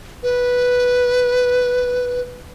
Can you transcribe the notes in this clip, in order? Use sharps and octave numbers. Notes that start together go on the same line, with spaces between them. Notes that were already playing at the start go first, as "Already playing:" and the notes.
B4